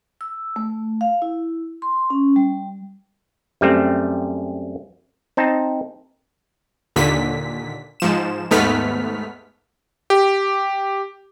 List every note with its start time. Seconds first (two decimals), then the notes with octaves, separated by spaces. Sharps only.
0.21 E6
0.56 A3
1.01 F5
1.22 E4
1.82 C6
2.10 C#4
2.36 G3
3.61 F#2 G3 A3 C4
5.37 C4 D#4 A5
6.96 D#2 A#2 D3 B6
8.00 G#2 F3 E7
8.51 D#2 G#2 A3 B3 F6 B6
10.10 G4